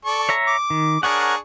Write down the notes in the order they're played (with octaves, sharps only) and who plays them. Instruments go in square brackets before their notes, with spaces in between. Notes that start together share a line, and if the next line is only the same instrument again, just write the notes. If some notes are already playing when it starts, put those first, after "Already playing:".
[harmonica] A4 D5 C#6
[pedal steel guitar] C#5 E5 A#5
[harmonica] D6
[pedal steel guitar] D#3
[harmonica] D4 G#4 C#6 [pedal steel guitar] A#4 C#5 F#5